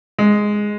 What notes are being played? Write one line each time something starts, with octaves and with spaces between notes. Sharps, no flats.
G#3